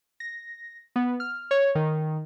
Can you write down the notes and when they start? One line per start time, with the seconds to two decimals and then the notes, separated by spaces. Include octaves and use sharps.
0.20 A#6
0.96 B3
1.20 F6
1.51 C#5
1.75 D#3